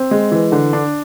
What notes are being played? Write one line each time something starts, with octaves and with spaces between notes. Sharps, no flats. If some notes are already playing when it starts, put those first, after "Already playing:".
Already playing: C4
G#3
E3
D3
D4